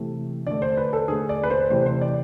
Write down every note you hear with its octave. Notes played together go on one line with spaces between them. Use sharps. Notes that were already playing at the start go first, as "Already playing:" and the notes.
Already playing: C3 E3 A3
D3 A3 D5
C5
B4
A4
D3 A3 G#4
D5
B4
C5
C3 E3 A3 C5
C5
D5